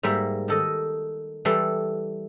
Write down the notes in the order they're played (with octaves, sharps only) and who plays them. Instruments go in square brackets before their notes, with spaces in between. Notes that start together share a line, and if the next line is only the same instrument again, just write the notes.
[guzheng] G#2 G3 A#3 E5
D#3 A4 D#5
E3 G3 A4 C6